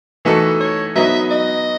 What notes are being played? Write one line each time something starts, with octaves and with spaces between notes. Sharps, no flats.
E3 A3 D#4 F#4 A4 B4
C#5
F#3 B3 D#4 E5
D#5